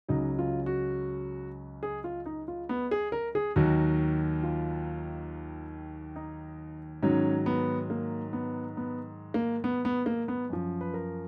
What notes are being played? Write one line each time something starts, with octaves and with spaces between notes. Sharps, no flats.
C#2 C#3 F#3 D#4
F4
F#4
G#4
F4
D#4
F4
B3
G#4
A#4
G#4
D#2 D#3 F#3 F#4
F4
D#4
G#2 D#3 F#3 C#4
B3
A#3
B3
B3
A#3
B3
B3
A#3
B3
F#2 F3
B4
A#4